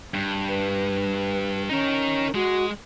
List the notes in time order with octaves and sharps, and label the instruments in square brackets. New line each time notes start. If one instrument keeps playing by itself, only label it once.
[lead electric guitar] G2
[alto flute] B4
[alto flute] C#4 [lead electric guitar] D#4 A#4
[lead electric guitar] G#3 [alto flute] F#4